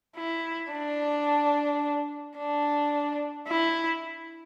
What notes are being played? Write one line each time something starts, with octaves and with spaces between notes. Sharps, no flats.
E4
D4
D4
E4